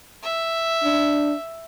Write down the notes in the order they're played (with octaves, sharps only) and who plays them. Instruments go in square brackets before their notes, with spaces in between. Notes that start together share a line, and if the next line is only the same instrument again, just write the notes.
[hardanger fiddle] E5
[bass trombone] D4